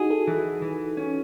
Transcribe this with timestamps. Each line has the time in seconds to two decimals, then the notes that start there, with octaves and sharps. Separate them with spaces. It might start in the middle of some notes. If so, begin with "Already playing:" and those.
Already playing: D#4 E4 F#4 G#4
0.10 F#4 A4
0.27 E3
0.62 E3
0.97 C#4